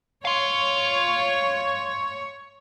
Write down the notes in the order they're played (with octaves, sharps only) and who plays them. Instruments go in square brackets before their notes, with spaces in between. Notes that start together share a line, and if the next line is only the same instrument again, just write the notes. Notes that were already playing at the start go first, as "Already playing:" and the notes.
[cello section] C#5 [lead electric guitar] F5 C6